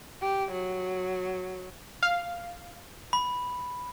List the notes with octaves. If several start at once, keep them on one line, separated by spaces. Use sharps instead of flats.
G4
F#3
F5
B5